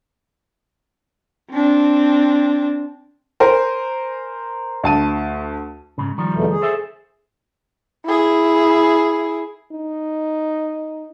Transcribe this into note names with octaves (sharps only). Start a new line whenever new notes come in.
C4 D4
A#4 C5 G#5 A#5
D2 A5 D#7
G#2 C#3
D#3 F3 G3
E2 B2 A3
G#4
A4 C5 E5
E4 G#4
D#4